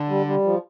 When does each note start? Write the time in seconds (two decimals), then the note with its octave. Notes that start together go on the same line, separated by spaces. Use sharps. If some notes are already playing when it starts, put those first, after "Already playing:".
Already playing: D3
0.09 G3
0.26 G3
0.45 F3